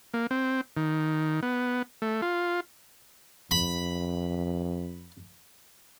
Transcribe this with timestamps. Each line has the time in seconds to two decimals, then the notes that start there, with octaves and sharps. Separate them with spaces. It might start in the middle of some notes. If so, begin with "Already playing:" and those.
0.14 A#3
0.31 C4
0.77 D#3
1.43 B3
2.02 A3
2.22 F4
3.51 F2 B5